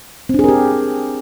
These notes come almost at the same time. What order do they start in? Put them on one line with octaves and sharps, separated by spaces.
C4 D4 G#4 A#4 G4